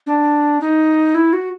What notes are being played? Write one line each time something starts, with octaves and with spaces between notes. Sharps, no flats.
D4
D#4
E4
F#4